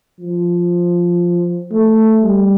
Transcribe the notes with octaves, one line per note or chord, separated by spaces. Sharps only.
F3
A3
G3